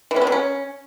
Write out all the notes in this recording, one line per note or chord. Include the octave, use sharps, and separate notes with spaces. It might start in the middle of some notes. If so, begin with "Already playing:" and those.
E3
C#4
B3
F#3
C#4